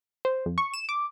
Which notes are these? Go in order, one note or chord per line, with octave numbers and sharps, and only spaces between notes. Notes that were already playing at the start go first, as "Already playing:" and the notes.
C5
F2
C#6
E7
D6